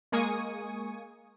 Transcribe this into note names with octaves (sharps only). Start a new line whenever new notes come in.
G#3 A#3 G#5 C#6 D#6